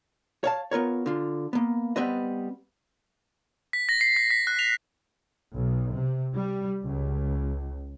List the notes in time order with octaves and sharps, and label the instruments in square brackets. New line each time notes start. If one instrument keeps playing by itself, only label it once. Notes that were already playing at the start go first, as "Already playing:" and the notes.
[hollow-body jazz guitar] C#5 F5 A5
B3 F4 A#4 C#5
D3 F4
A#3 B3
G3 B3 C4 B4 D#5
[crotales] B6
A#6
C7
B6
B6
F#6
F7
[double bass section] B1
C3
G3
C#2